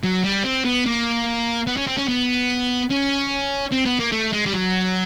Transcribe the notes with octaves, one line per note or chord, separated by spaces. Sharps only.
F#3
G3
C4
B3
A#3
B3
C#4
C4
C#4
B3
C#4
C4
B3
A#3
A3
G#3
G3
F#3